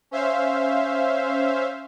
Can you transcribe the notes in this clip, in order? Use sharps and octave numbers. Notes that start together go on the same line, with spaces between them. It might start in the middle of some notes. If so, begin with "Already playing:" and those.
C#4 C5 E5 F5